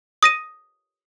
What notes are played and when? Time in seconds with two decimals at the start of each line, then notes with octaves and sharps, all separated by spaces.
0.23 D#6 A#6 D#7